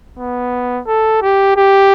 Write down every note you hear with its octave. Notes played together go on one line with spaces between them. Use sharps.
B3
A4
G4
G4